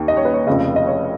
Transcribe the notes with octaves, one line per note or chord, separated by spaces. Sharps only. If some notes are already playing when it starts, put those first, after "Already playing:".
Already playing: D#2 D#3
D#5
C#5
B4
C#5
F1 F2 C#3 D#5
D#5
C#5